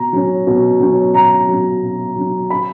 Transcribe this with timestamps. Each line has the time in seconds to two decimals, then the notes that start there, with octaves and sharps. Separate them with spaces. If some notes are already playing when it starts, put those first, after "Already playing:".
Already playing: B2 A#5
0.13 F#3 C#4
0.47 B2
0.80 F#3 C#4
1.14 B2 A#5
1.49 F#3 C#4
1.82 B2
2.16 F#3 C#4
2.50 B5